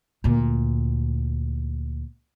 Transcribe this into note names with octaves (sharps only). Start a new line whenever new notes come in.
D2 A#2